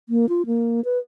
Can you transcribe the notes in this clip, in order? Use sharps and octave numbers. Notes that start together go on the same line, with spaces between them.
A#3
F4
A#3
B4